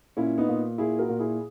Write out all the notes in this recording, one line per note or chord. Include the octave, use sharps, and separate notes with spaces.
A#2 C#4 E4
B3 D#4
A#2
A#2 E4 G#4
F#4 A#4
A#2
E4 G#4